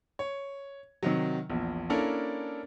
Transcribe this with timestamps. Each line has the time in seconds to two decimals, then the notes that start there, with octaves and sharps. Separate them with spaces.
0.19 C#5
1.03 C3 D#3 F#3
1.50 A#1 E2
1.90 A#3 C#4 D4 E4 A4 A#4